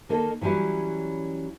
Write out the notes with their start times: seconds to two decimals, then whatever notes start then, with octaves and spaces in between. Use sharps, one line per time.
0.09 D#3 A#3 A4 D#5
0.41 E3 F#3 G3 C#4 E4